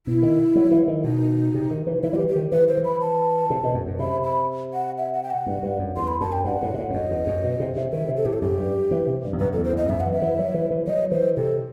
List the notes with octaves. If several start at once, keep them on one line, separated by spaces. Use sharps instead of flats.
B2 E4
D#3
F#3
E3
D#3
B2 D#4
C3
D#3
E3
E3 E4
F#3 G4
E3
G4
D#3
E3 B4
C5
E3
B5
A5
C3
B2
F#2
F#2
C3 B5
B5
F#5
E5
F#5
G5
F#5
G2
G2
F#2
E2 C6
B5
F#2 A5
G5
G2 F#5
A2
B2
A2
E2
F#2 D#5
E2
F#2
B2
C3
C3
D#3 E5
C3
A4
A2 G4
A4
F#2 G4
G2
E3
C3
G2
E2
F#2 B4
A4
E2
C5
E2 D#5
F#2 E5
E3 F#5
E5
E3
F#3
E3
E3
F#3 D#5
E3 C5
C3 A4